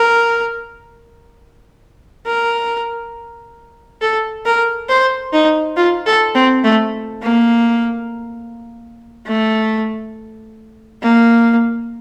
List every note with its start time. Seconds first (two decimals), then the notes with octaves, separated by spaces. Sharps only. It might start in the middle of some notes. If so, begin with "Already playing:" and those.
Already playing: A#4
2.27 A#4
4.02 A4
4.46 A#4
4.89 C5
5.33 D#4
5.77 F4
6.06 A4
6.35 C4
6.64 A3
7.22 A#3
9.27 A3
11.02 A#3